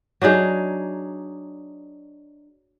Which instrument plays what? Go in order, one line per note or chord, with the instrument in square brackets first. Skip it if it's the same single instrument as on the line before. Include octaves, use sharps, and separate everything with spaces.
[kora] F#3 D4 D#4 G#4